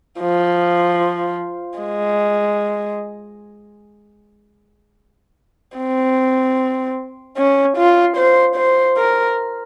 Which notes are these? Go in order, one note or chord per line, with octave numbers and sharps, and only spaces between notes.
F3
G#3
C4
C#4
F4
C5
C5
A#4